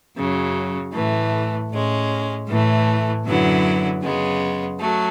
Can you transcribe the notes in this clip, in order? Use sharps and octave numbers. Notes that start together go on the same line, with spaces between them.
F#2 C#3 F#3
A2 E3 A3
A2 G#3 C#4
A2 E3 A3
F#2 D3 F#3 B3 E4
F#2 C#3 G#3 B3
F#3 A3